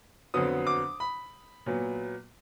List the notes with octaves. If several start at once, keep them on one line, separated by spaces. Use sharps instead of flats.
F2 D3 F#3 B3 D#6
D6
B5
A#2 F#3 B3